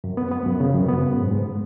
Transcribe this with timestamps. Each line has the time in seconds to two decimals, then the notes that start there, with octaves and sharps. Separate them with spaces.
0.04 F#2
0.17 B3
0.31 B3
0.46 F#2
0.60 C#3
0.74 F#2
0.89 B3
1.02 F#2
1.17 G#2
1.31 G#2